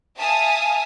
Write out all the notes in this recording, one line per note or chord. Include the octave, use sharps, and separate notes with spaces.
E5 F5 G#5 A5 D#6